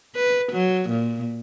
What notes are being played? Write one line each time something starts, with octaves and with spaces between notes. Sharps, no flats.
B4
F#3
A#2